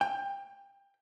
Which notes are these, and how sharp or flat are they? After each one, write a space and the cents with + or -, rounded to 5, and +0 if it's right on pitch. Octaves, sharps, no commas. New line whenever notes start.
G5 +20